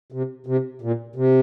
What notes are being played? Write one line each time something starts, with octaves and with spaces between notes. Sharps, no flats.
C3
C3
A#2
C3